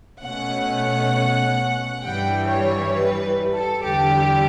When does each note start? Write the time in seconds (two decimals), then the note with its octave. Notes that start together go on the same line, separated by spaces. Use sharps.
0.22 B2 A3 C#4 F#5
2.03 G2 E3 G3 G5
2.48 C#5
2.93 B4
3.54 A4
3.84 E2 D3 G3 G4